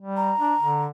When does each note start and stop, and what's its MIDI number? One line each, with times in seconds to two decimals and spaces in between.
0.01 0.32 55
0.17 0.82 82
0.40 0.55 62
0.60 0.88 50